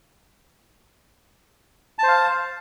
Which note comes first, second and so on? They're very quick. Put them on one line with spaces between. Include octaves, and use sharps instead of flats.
A5 C5 F5